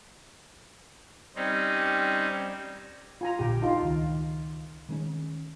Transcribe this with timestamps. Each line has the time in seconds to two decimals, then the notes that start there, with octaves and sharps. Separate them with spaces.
1.36 G3 C4 C#4 D#4
3.21 F4 G#5 A#5
3.39 A#1 A#2 D3 G4 G5
3.62 D4 D#4 F4
3.82 C#2 D#3
4.89 D#3 G#3 C#4